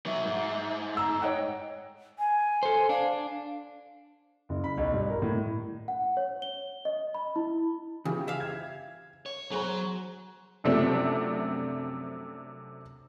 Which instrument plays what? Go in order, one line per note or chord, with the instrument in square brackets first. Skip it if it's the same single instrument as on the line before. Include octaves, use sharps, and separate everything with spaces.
[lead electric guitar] F#3 D#4 [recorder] E5
[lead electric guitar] G#2
[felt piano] A#5 E6
[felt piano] C#5 D#5 F#5 [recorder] G5
[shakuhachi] G#5
[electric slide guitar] A4 C5
[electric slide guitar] D4 [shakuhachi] F5
[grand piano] F#1
B5
B1
G2
A#4
A2
[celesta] F#5
C#5
G7
D#5
B5
E4
[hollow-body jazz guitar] C#3 [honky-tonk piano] E3 F4 G4
[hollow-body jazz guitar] E5 F5
[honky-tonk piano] G#6
[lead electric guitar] C#5
[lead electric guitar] F#3 [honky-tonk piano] G#4 C5 A#5
[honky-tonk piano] F#2 C3 F3 A3 C4 D4